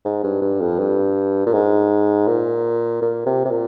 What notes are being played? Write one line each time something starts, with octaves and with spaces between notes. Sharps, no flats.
G#2
G2
G2
F2
G2
A#2
G#2
A#2
A#2
C3
C3
A#2